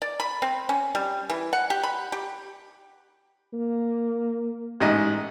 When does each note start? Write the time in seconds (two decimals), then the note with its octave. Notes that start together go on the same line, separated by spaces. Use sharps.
0.02 D5
0.20 B5
0.42 C4
0.69 C#4
0.95 G3
1.29 E3
1.53 F#5
1.70 G4
1.83 B5
2.12 G4
3.53 A#3
4.80 A1 G#2 D#5